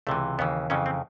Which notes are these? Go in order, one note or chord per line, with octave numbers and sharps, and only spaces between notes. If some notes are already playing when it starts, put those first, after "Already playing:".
C#2 C3 E3 A3
D#2 C#3 E3 B3
F2 C#3 E3 C#4
C4